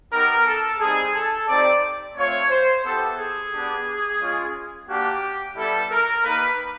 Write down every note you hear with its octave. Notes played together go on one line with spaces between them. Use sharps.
B3 D#4 G4 A#4
A4
G3 C4 D#4 G#4
A4
C4 D#4 G4 D5
A3 C4 F4 C#5
C5
B3 E4 G4 A4
G#4
B3 D4 G4
G#3 C#4 F4
A#3 D4 F#4 G4
G3 B3 E4 G4 A4
A#4
A#3 D#4 G4 B4